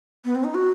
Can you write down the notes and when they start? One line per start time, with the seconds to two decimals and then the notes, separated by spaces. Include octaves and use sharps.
0.25 B3
0.35 C4
0.44 D#4
0.54 F#4